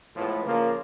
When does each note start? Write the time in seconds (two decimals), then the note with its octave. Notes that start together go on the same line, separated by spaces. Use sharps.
0.15 A2 F3 G#3 B3
0.44 C#3 F3 A#3